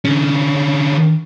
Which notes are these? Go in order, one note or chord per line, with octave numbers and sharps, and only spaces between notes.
D3 C#4